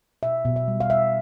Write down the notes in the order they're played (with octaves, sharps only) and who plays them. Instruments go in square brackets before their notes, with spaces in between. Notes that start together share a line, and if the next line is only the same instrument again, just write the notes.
[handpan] B2 E5
B2
E5
G3
F5
G3 E5